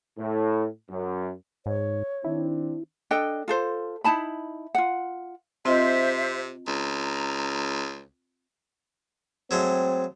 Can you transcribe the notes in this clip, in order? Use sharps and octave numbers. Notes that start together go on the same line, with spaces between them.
A2
F#2
G#2 C#5
D#3 C4 D4 E4
D4 A4 D#5 G5
F4 A4 C5
D#4 E4 A5 B5
F4 F#5
C3 C4 F4 C5 D#5 E5
C#2 A#5
F#3 G#3 A3 C4